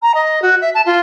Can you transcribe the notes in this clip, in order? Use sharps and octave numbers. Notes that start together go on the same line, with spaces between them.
A#5
D#5
F#4
E5
A5
F4